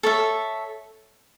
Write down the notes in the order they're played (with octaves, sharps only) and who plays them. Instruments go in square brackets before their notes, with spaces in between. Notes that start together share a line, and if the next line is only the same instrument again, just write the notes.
[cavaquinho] A4 C#5 E5